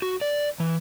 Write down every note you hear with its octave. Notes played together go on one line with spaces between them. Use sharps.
F#4
D5
E3